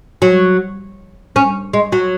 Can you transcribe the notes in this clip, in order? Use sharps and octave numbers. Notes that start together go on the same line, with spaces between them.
F#3
C#4
G#3
F#3